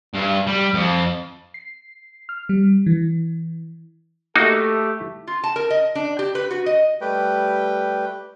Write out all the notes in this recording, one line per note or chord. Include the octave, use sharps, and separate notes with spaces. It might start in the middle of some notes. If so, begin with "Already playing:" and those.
G2
G3
F2
C7
F6
G3
E3
A3 A#3 D#4 F#4 G4 A4
F4
A5
A#4
D#5
D4
G4
B4
F#4
D#5
G3 A3 G4 B4 G5